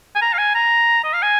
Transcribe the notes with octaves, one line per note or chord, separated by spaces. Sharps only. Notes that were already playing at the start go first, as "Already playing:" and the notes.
G#5
A#5
F5
G#5
A#5
D#5
F5
G#5